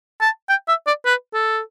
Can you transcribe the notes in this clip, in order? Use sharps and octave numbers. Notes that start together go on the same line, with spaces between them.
A5
G5
E5
D5
B4
A4